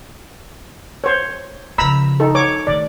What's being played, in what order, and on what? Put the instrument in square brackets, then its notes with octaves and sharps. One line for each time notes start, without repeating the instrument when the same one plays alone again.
[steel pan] C5 C#5
[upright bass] C#3 F3 [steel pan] A#5 B5 E6
[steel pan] D#4 A4
C#5 D6
[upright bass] D#3 A3 [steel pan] D5